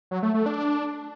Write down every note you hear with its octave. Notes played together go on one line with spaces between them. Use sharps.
F#3
A3
A3
D4